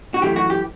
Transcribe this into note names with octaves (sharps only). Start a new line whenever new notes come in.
F#4
F#2 E3 A3 G4
F#4
G4